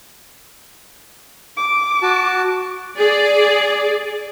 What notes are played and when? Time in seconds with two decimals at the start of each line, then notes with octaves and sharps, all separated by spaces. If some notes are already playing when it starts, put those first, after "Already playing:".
1.57 D6
2.02 F#4 A5
2.97 G#4 D5